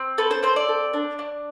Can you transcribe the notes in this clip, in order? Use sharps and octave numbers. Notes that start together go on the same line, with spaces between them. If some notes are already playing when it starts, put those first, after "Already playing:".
Already playing: C4
A4 B4
C5
C4 C5
D5
A4
D4
D4